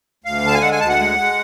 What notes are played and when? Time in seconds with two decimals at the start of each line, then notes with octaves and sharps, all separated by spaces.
0.24 D2 F5
0.44 D3 A5
0.54 G#5
0.61 G#3 F#5
0.71 G#5
0.80 D2 A5
0.89 F#5
0.99 G#3
1.18 G#3